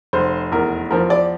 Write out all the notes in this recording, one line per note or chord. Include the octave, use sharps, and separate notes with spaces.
F1 C5
E2 A#4
F3 A#4
D5